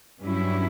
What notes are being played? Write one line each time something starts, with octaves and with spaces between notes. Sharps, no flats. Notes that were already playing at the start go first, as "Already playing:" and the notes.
G2 F#3 C#4 E4